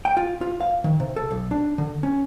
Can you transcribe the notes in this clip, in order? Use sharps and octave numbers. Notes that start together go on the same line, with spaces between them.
G5
F4
F4
F5
D#3
C3
A4
B1
D4
D3
C#4